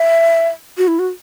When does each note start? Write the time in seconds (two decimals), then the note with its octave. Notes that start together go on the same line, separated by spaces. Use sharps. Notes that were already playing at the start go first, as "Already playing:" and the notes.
Already playing: E5
0.78 F#4
0.88 E4
0.99 F#4